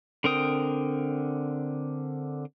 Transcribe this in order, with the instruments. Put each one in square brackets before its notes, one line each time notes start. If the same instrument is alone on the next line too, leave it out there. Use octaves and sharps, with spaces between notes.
[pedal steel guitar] D3 C4 A#4 G5 D#6